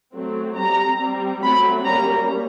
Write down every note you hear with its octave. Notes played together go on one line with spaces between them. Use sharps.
F#3 A3 C4
G3 C4 A#5
G3 C4
F#3 A3 C4 B5
G3 A#3 C#4 A#5